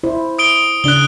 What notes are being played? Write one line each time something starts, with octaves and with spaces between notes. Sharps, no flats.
E4 C5
D#6 D7 G7
C#3 D4 F#6 G7